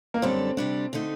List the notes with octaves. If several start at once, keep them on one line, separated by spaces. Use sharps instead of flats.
A#3
F#2 D3 G3 C4 D4 A4
D2 C3 G3 D4
D3 A3 D#4